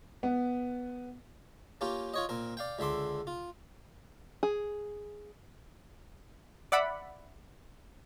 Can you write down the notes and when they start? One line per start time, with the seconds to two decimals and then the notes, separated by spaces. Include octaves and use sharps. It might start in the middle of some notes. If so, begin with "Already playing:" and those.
0.23 B3
1.81 A#3 C#4 F4 G4
2.14 F4 C#5 D#5
2.29 A#2 C4 A#4
2.57 D5 F5 G5
2.79 C#2 D3 E5 C6 D6
3.27 F4
4.43 G#4
6.72 D5 E5 F#5 B5